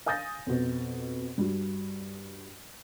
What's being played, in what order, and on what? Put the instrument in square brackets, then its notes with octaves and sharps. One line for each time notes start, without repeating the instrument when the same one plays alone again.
[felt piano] F5 G#5 D#6 G6 A6 A#6
F2 B2
G2 F#4